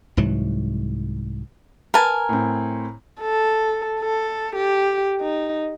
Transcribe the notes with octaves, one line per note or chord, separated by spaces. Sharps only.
C2 G#2 E3 F#3
A#4 B4 G#5 A5
A2 C4
A4
A4
G4
D#4